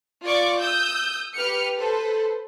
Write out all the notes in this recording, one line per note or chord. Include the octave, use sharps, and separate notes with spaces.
F4 D5 C#6 D6
D#6 E6 G6
G4 B4 F6 C#7
A4 B4 C5